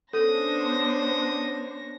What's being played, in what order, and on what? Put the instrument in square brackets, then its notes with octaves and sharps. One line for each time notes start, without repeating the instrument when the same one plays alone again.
[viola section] B3 D4 C5 [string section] C#4 A#6 [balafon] A4 [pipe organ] D#6